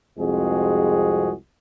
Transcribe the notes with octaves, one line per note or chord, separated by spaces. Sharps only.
C2 F2 G#3 C4 F#4 G#4